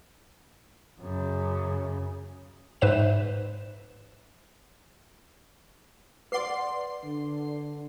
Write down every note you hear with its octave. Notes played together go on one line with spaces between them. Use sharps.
F#2 C#3
G#2 B4 C5 E5 E7
B4 D5 F#5 C6 C7
D3